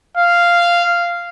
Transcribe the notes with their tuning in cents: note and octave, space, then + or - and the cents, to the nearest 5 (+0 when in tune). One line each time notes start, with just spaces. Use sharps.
F5 -10